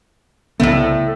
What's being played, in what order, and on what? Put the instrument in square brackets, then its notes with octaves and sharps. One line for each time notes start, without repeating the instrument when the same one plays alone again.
[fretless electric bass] C2 C#3 B3 [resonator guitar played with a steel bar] A2 A3